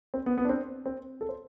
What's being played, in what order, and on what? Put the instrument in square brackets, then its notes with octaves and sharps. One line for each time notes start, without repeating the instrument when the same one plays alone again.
[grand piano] C4
B3
B3
D4
C4
C4
A4
C5